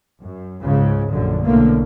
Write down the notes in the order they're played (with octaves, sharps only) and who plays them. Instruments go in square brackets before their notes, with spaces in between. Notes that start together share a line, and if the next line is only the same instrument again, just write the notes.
[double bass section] F#2
C#2 G#2 C#3
A#1 F#2 D3
B1 A2 D3 A3 A#3